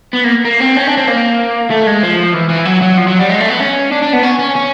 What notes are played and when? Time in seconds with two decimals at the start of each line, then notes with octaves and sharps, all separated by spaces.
0.13 B3
0.24 A#3
0.45 A#3
0.60 C4
0.76 C#4
0.87 D4
0.97 C4
1.07 A#3
1.70 A3
1.87 G#3
2.03 F3
2.34 E3
2.50 E3
2.65 F#3
2.82 F#3
2.98 F3
3.08 F#3
3.19 G3
3.29 G#3
3.40 A3
3.50 B3
3.60 C#4
3.92 D4
4.03 D4
4.13 B3
4.23 C#4
4.39 C#4
4.56 C#4